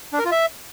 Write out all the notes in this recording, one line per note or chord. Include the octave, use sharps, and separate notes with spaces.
D4
A#4
F4
E5